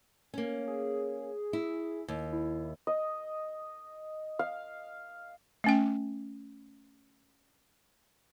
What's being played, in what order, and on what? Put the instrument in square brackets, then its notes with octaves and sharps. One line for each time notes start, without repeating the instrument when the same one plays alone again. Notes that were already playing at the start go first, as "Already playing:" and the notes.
[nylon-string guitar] A#3 C#4
[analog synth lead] G#4
[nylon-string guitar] E4
D#2
[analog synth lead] E4
[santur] D#5
F5
[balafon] A3 C#4 G5